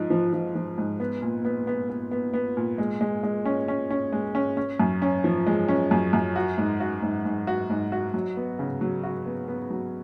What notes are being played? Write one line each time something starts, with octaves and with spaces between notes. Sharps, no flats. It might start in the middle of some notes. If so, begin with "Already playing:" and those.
Already playing: G#2 F3 D#4
F3
F3
F3
G#2
B3
A#2
B3
B3
B3
B3
B3
A#2
G#3
G#3
G#3
C#4
C#4
C#4
G#3
C#4
C#4
F#2
C#4
F3
G#3
C#4
F#2
F#2
F#4
G#2
F#4
G#2
G#2
F#4
G#2
F#4
F#3
B3
C#3
F#3
F#4
B3
B3
F#3